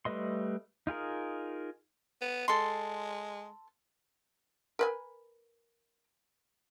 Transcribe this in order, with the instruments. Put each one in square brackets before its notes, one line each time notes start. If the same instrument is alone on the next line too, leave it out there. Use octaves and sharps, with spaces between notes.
[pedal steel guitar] G3 A3 B4 D#5 C6
D#4 F4 G#4 A#4
[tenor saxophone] B3
[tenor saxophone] G#3 [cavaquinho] A4 C6
[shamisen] A#4 B4 G#5